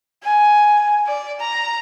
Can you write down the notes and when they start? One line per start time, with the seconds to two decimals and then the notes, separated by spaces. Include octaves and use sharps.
0.24 G#5
1.07 D5
1.40 A#5